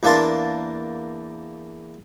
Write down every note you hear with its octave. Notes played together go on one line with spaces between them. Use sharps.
E2 A#3 D4 A5 C6